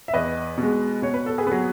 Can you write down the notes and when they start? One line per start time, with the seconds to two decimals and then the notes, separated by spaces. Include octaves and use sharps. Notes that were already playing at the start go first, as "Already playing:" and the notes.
0.08 E5
0.13 E2 B4 D#5
0.58 B2
0.63 G#3
1.02 B2 C#5
1.14 B4
1.26 A4
1.38 G#4 B4
1.47 F#3 B3